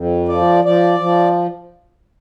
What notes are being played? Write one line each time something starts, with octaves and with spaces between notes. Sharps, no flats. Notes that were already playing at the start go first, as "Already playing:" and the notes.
Already playing: F2
F3 D5
F3 D5
F3